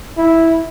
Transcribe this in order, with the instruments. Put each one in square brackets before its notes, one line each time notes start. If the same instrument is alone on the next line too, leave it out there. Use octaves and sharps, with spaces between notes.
[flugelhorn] E4